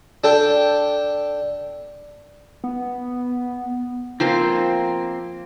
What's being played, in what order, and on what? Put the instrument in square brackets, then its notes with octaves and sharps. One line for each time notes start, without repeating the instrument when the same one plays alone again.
[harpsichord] D4 A4 G5
[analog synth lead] B3
[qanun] F3 C5 C6 [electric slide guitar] A#3 C4